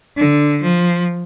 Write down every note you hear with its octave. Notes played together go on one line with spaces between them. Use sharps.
D3
F3